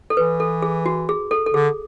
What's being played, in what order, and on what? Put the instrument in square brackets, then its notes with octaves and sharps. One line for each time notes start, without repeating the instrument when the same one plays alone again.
[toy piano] A4
[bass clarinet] E3 [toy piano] B4
[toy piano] A4
G#4
F#4
G#4
A4
A4
[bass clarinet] D3 [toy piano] G#4